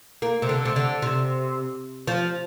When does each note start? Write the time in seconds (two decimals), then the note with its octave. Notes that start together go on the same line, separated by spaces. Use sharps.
0.22 A#3
0.42 C3
0.49 D3
0.65 C3
0.76 D3
1.02 C3
2.07 F3